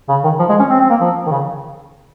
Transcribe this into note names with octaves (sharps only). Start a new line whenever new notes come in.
C#3
D#3
F3
G#3
C#4
C4
C4
A#3
F3
D#3
C#3